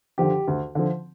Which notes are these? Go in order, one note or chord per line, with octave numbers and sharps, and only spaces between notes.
D3 F3 G4
D2
D3 F3